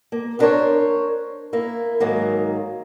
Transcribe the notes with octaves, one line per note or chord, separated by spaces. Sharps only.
A#3
B3 C#4 D4 A#4 C5 C#5
A#3 E4
G#2 D#3 F#3 A#3